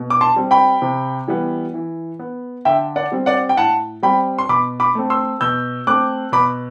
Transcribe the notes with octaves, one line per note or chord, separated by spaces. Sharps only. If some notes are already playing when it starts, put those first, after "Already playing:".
Already playing: B2
D6
A5 C6
G3 C4
G5 B5
C3
E3 G3 B3
E3
B3
D3 E5 G5
D5 F#5
G3 C4
D5 F#5
G5
A2 F#5 A5
G3 C4 G5 B5
C6
B2 B5 D6
B5 D6
A3 C4
C6 E6
B2 E6 G6
A3 C4 D6 F#6
B2 B5 D6